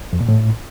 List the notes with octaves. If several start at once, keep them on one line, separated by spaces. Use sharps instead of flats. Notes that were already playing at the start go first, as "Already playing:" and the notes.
F2
A#2
A2